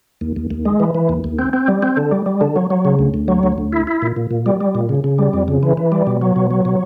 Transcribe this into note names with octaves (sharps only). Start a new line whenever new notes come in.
D#2
D#2
D#2
G#3
E3
E3
D#2
D#2
C4
C4
G3
C4
D3
G3
G3
D3
F#3
F#3
C#3
D2
D2
F#3
D2
D2
E4
E4
A#2
A#2
A#2
G3
G3
A#2
C#3
C#3
G3
F2
C#3
E3
E3
G3
B2
F#3
B2
F#3
B2